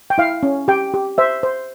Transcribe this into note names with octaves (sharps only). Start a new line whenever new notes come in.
G5
E4 F5
C#4
G4 G5
G4
C5 E5
C5